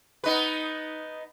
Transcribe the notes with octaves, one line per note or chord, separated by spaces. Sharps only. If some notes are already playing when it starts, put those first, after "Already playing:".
B3 D#4 B4